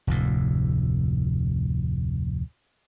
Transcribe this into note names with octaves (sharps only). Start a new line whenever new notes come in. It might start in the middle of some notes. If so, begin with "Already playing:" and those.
F1 D2 A2